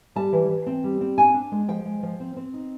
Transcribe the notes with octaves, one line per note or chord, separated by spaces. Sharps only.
G3 A5
E3
E3
C4
G3
C4
D4 G#5
D4
G#3
F3 G5
G#3
F3
C4
C4
D#4